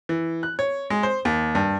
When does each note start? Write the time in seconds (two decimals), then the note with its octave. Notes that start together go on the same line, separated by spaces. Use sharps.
0.09 E3
0.43 F#6
0.59 C#5
0.90 G#3
1.03 C5
1.25 D#2
1.55 G2